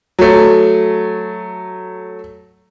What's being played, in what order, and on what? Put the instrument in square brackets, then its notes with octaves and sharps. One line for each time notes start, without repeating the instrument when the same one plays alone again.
[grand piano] F#3 A3